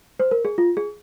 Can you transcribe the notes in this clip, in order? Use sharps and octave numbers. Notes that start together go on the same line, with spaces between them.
C5
A#4
G#4
F4
G#4